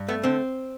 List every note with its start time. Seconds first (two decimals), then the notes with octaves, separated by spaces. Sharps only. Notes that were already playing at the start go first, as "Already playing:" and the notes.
Already playing: G2
0.08 A3 B3
0.24 D3 C4